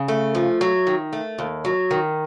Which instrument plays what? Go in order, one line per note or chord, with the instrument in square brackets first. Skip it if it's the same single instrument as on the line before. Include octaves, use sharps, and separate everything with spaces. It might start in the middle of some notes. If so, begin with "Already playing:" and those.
Already playing: [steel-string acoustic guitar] C#3
A3
F3
F#3
D#3
A3
D#2
F#3
D#3